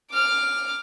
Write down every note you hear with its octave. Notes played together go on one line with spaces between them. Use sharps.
D6 F6